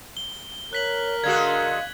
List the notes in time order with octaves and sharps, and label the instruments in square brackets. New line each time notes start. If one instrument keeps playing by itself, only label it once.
[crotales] G7
[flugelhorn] A#4 [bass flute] C#5 [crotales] F#6 B6 F#7
[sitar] D3 G#3 F#4 [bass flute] F5 [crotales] G#6